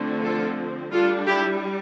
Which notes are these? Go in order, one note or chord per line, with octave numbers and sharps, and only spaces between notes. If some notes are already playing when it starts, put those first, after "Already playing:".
Already playing: D3 F3 A3 C4
F4 A4
G3 D4 F4 A4
E4 G4